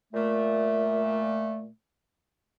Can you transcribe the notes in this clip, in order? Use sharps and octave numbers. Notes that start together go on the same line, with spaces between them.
A#2 A3